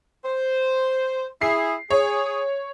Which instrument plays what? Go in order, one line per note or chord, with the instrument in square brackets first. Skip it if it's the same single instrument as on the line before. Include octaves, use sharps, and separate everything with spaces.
[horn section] C5
[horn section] E4 G#4 [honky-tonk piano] C7
[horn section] G#4 [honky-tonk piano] C#5